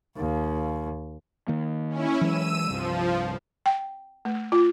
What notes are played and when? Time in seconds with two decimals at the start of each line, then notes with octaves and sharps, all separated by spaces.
0.17 D#2
1.48 D#3 A#3
1.89 C#4 E4
2.21 E3 F#3 G#3 E6 D#7
2.69 C2 G2 F3
3.66 G5
4.25 A3
4.52 F4